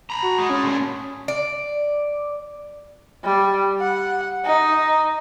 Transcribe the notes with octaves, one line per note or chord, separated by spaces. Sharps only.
A#5 B5
F#4
G#3 D#4
C#4
A#2 A3
D5
G3
F#5
D#4